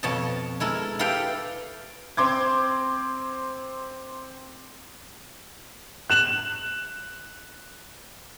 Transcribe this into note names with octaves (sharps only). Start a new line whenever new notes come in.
F2 B2 C#5 D#5 A5
G#3 E4 A4 A#4
E4 G4 A4 B4 F5 G5
C4 C6 D6 G#6
F#6 E7 F#7